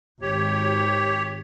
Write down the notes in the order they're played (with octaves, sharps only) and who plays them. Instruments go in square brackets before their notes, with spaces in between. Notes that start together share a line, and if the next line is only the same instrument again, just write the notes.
[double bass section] G#1 [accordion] G4 C#5